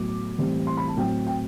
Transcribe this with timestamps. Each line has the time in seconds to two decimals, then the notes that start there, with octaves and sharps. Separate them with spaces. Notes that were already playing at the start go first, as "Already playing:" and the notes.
Already playing: A2 F#3 B3 D6
0.38 A2 E3 G3 C4
0.67 C6
0.77 B5
0.88 A5
0.97 A2 F#3 C4 G5
1.27 G5